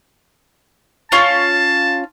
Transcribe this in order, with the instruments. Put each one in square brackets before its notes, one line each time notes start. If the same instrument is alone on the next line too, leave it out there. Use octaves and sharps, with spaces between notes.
[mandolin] C#4 F4 C#6 [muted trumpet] A5